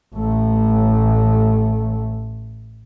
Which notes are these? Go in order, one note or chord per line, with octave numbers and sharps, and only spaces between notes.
A1 A3